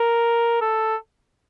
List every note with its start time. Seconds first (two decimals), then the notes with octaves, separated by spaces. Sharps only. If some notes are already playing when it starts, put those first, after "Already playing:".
Already playing: A#4
0.61 A4